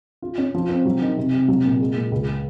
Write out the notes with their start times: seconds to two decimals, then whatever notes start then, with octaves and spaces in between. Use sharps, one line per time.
0.22 F4
0.38 C#4
0.55 F3
0.69 C4
0.85 F#3
1.01 D#3
1.17 C3
1.33 C3
1.48 F#3
1.65 A#2
1.81 G#3
1.96 A#2
2.12 C#2